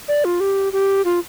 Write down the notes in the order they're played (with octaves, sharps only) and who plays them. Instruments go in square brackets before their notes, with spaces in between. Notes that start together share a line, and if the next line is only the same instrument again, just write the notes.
[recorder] D5
F4
G4
G4
F4